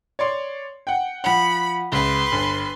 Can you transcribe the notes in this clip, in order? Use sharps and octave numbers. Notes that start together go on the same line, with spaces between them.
C#5 D5 C6
F#5 G5
F3 F#5 B5
C#2 B4 C6
G1